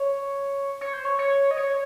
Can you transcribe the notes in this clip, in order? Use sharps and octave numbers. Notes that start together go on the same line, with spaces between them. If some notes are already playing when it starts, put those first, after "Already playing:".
Already playing: C#5
C#5
C5
C#5
C#5
D#5
C#5